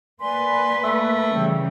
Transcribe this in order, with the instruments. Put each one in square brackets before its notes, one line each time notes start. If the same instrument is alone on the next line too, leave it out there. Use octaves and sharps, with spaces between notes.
[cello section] A#3 B4 [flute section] D5 G#5 C6
[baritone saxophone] A3
[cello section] C#3 E3 G3 [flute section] G5